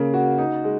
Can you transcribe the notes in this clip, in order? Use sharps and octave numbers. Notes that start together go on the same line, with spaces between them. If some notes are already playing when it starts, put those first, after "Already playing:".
Already playing: C#3 A#3
F#4
D#4
G#3